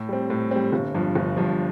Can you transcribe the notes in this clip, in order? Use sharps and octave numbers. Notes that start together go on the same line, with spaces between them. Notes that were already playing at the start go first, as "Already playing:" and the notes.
Already playing: A2
G3 C4
A2
G3 C4
G1
G2 F3
G1
G2 F3